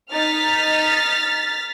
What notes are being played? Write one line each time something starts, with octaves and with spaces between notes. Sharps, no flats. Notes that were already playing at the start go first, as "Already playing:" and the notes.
D#4 F6 A6 B6